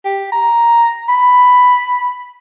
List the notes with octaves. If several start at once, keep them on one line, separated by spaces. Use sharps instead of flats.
G4
A#5
B5